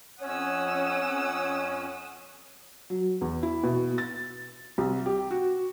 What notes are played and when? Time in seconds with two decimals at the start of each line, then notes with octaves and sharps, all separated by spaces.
0.21 F2 C#4 C#5 F#5 D#6 E6
2.90 F#3
3.21 E2
3.43 E4
3.63 B2
3.98 A6
4.78 C2
5.06 G4
5.31 F#4